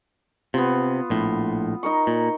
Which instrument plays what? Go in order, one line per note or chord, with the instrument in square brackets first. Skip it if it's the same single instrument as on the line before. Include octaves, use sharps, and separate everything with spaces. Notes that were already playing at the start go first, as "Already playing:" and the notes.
[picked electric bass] C3 [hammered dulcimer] B3 F4
[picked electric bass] A#1 A2
[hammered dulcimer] D#4 A#4 C#6
[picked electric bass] A#2